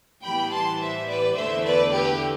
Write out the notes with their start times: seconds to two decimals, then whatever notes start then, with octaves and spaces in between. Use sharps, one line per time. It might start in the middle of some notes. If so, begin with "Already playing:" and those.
0.23 A2 E3 G3 B3 G5 B5
0.51 A5 C6
0.79 C5 E5
1.08 B4 D5
1.35 E2 D3 A3 C5 E5
1.64 B4 D5
1.92 G4 B4